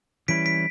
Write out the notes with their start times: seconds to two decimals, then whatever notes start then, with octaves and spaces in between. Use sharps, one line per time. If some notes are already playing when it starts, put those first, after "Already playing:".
0.28 E3 G3 C#4 E4 B6 D7
0.46 B6 D7